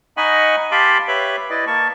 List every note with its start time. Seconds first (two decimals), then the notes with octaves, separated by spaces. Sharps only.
0.17 D#4 D#5 F#5 G#5 B5 C#6
0.71 G4 F5 A5 B5 C6 D6
1.08 G4 B4 C#5 E5 B5
1.50 E4 B4 D5 D#5
1.67 A#3 A5 C#6